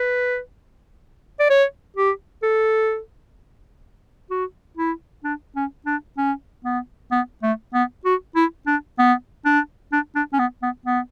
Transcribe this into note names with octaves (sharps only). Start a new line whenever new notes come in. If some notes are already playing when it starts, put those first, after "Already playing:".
Already playing: B4
D5
C#5
G4
A4
F#4
E4
D4
C#4
D4
C#4
B3
B3
A3
B3
F#4
E4
D4
B3
D4
D4
D4
C#4
B3
B3
B3